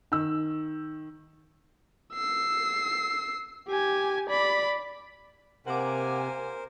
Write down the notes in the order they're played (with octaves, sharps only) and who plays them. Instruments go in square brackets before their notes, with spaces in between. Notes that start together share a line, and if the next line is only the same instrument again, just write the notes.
[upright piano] D#3 E6
[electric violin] E6 C7
G4 G#5
D5 B5
[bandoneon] C3 [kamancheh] A#3 G#5 [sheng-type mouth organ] A#4 C5 [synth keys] F#5 D6